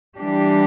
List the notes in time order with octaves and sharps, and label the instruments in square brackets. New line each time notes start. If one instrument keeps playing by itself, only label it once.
[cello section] E3 G3 D4 G4